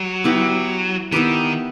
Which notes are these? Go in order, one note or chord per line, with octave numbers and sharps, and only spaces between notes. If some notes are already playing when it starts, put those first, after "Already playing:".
Already playing: F#3 G4
B3 E4 G4 B4
D#3 B3 E4 G4 B4